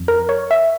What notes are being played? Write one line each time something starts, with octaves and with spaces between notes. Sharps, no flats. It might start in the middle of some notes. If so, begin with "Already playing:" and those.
Already playing: F2
A#4
C#5
E5